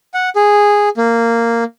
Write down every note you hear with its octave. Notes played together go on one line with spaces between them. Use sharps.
F#5
G#4
A#3